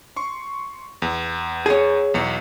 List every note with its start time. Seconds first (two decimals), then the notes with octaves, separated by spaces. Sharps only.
0.16 C6 C#6
1.02 E2
1.66 G#4 C#5
2.14 B1 E2 C#7